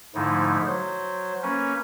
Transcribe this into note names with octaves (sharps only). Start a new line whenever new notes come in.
G#2 D3 F3 A3 D#4 E4
F#3 C5
A#3 C#4 B4 C#5